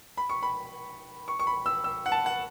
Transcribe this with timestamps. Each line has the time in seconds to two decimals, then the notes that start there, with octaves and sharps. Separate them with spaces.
0.17 B5
0.29 C#6
0.43 B5
1.28 C#6
1.39 C#6
1.47 B5
1.66 E6
1.84 E6
2.06 F#5
2.12 A5
2.26 F#5